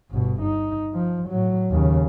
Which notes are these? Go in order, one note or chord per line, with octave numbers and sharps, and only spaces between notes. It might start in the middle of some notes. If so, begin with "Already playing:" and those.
G1 B2
D#4
F3
A2 F#3
D#2 C#3